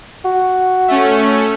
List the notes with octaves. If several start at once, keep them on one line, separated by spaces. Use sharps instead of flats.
F#4
A3 C#4